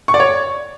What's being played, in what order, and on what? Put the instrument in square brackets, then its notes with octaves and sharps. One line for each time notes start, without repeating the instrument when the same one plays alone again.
[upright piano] C#6
D5
C#5